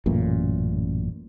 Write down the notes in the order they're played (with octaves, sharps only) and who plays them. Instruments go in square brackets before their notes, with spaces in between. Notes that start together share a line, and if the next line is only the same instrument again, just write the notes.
[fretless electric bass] A1 F#2 A#2